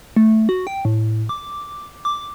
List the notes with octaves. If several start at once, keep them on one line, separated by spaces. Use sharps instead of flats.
A3
F#4
G5
A2
D6
D6